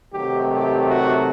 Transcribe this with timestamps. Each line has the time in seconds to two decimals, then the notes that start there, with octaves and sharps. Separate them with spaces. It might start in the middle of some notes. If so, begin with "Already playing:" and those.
0.13 C3 D#3 F#3 A3 G4
0.51 G4
0.88 F#4